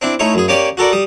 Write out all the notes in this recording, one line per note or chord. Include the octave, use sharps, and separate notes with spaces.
C4 D4 E4
A3 D#4 E4 C#5
F#2 G#4
A#3 C#4 G4 C#5 D5
F#4 A4 A#4 D5
G3 D#6